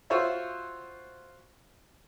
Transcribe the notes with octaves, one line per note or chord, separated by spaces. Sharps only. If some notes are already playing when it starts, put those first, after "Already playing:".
F4 F#4 C5 C#5 E5